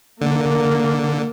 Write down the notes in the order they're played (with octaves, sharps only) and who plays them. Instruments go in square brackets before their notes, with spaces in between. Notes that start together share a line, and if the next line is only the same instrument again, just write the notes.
[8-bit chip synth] D3 [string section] A#3